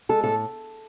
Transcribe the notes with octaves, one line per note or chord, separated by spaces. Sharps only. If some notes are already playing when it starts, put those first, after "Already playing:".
G#3 A4
A2 A4